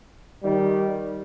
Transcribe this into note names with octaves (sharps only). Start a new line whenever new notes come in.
D#3 G3